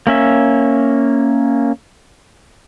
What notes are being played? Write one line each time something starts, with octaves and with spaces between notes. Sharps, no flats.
A#3 C#4 E5